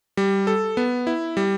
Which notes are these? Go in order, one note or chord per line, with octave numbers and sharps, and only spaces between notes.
G3
A4
B3
E4
G3